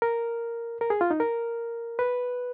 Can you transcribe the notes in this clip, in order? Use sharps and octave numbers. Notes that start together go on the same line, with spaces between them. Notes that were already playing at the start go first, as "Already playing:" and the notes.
A#4
A#4
G#4
F4
D#4
A#4
B4